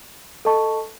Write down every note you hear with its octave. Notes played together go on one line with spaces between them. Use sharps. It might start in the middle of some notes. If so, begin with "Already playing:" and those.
A4 D#5 A5 C#6